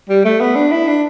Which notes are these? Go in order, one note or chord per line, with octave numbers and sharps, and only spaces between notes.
G3
A3
B3
D4
E4
D4